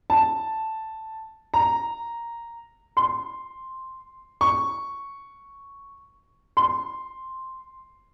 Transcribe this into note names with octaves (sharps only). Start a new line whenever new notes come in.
A5
A#5
C6
C#6
C6